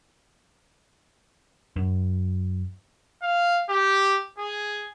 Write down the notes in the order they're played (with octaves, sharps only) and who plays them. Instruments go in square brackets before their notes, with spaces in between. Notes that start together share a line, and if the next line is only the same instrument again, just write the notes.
[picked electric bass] F#2
[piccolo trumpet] F5
G4
G#4